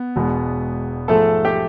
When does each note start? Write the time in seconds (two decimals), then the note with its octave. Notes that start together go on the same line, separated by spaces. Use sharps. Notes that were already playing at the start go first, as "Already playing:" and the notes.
Already playing: B3
0.16 E1 E2 B2 G#3
1.08 G#2 F3 G#3 A3 A4
1.45 G4